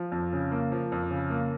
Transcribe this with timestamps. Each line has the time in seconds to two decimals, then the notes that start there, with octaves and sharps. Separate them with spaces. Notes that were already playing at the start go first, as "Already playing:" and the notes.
Already playing: F3
0.12 F2
0.33 C#3
0.52 A#3
0.72 F3
0.92 F2
1.11 C#3
1.30 A#3